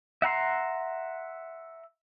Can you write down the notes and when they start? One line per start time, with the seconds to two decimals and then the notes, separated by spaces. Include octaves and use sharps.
0.22 E5 F#5 A#5 C6